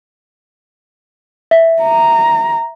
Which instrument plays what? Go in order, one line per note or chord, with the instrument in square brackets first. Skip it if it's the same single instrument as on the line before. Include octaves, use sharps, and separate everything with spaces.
[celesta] E5
[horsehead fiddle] A#5